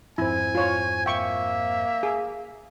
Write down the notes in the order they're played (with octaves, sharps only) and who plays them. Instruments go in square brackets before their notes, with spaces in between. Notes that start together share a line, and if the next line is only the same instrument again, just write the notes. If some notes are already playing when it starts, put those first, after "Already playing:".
[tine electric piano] F2 G#2 C5 [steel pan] E4 [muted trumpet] G#5
[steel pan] F4 C#5
[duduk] A#3 [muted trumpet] E5 [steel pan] G5 C#6
[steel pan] G#4